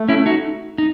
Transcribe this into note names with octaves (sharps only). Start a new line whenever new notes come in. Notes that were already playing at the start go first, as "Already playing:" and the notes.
Already playing: A3
C#4 E4
D#4 F#4
D#4